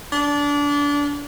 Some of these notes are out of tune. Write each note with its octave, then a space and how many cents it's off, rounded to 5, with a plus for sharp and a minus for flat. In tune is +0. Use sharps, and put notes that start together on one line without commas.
D4 -25